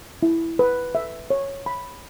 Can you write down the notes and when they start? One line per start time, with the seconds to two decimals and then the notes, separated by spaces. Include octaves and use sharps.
0.23 E4
0.59 B4
0.95 E5
1.30 C#5
1.66 B5